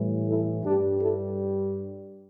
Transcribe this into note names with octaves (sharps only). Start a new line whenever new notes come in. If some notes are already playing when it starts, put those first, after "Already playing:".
Already playing: A2 E3 G3
E4 A4
G2 G3 D4 G4
E4 A4